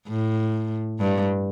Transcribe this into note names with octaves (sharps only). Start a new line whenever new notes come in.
A2
G2